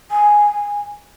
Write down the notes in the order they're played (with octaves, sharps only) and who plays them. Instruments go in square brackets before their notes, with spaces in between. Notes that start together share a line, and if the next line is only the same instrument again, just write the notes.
[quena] G#5